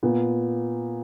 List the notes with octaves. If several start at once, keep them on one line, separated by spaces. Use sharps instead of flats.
A#2 B3